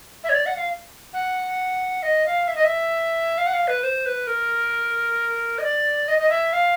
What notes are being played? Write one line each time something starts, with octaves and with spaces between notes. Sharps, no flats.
E5
C#5
D5
F#5
F5
F#5
D#5
F5
E5
D#5
E5
F5
F#5
F5
B4
C5
B4
A#4
D#5
D5
D#5
D#5
E5
F5